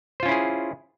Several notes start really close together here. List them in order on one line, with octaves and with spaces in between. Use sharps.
C5 F4 C#4 E4 G#4